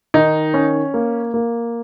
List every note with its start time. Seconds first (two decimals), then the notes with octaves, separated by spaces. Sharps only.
0.14 D#3 D#4
0.54 C#4
0.94 A#3
1.34 A#3